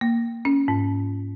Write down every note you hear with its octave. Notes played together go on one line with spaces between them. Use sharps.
A#3
C#4
G#2